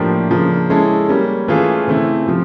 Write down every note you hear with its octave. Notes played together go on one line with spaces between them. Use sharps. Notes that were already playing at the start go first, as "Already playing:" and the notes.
Already playing: A2 F3 A#3 D4 G4
C#3 F3 A#3 D4
G#3 C#4 E4 A4
G3 A#3 C#4
E3 A3 C#4 F4 G#4
C#3 E3 A3 C4 E4
C3 F3